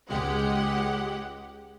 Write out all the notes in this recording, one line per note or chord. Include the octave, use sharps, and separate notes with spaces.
C#2 G#3 G4 F#5